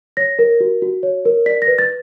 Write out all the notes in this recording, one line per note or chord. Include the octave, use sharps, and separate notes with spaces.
C#5 A#6
A#4
F#4
F#4
C#5
A#4
D5 B6
A#6
B4
A6